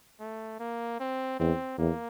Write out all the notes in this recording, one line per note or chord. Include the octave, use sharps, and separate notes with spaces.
A3
A#3
C4
E2 C4
E2 A#3